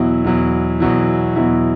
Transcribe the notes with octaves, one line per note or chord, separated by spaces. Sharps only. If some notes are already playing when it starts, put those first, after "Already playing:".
Already playing: E2 B2 F#3 E4
E2 B2 F#3 E4
E2 B2 F#3 E4
E2 B2 F#3 E4